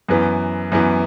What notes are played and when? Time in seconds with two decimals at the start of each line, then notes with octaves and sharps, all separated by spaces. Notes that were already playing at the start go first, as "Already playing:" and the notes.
0.08 F#2 E3 B3
0.72 F#2 E3 B3